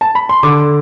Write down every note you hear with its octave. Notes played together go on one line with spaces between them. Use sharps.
A5
B5
C6
D3 D6